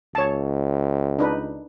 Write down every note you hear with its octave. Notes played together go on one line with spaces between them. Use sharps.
C#2 C#5 A5
D4 D#4 B4